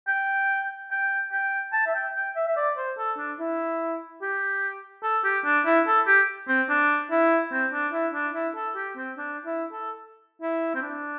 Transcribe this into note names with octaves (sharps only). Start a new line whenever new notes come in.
G5
G5
G5
A5
E5
G5
G5
E5
E5
D5
C5
A4
D4
E4
G4
A4
G4
D4
E4
A4
G4
C4
D4
E4
C4
D4
E4
D4
E4
A4
G4
C4
D4
E4
A4
E4
C4
D4